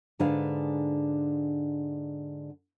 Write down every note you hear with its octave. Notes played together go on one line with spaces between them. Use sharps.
G#2 D3 D4 G#4 B4 F5